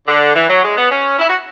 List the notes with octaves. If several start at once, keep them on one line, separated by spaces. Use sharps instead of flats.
D3
E3
F#3
G#3
B3
C#4
E4
F#4